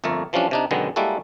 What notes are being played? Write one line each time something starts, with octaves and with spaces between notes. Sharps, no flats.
G1 F2 A3 A4 A#4
E3 F3 G3 C#4 D4
C3 D4 D#4
F#2 B2 D3 D#3 G#3 B3
G3 G#3 A#3 E4 F#4 A4